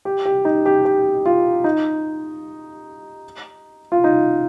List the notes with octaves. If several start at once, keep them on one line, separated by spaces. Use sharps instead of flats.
G4
G4
D#4
G4
G4
F4
D#4
F4
D#4